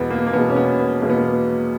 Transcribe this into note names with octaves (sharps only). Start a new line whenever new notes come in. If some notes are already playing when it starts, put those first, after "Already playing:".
Already playing: E2 B2 G#3 B3
A#3
A#3
E2 B2 G#3 B3
C#4
B3
B3
E2 B2 G#3 A#3
B3
A#3